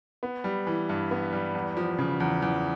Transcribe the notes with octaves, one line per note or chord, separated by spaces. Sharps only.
B3
G3
E3
G2
B3
G3
E2
F3
C#3
E2
E2